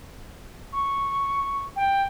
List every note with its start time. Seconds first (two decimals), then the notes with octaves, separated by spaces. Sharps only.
0.73 C#6
1.76 G5